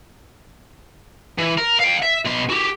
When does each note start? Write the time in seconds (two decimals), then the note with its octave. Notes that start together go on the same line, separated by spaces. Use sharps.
1.38 E3
1.58 A#4
1.80 F5 G5
2.03 E5
2.26 B2 C6
2.50 F#4 G4